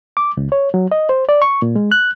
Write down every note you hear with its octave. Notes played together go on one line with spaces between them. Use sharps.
D6
C#2
C#5
F#3
D#5
C5
D5
C#6
A#2
G#3
F#6